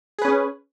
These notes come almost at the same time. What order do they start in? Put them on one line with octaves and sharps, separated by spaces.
G#4 B4 C#4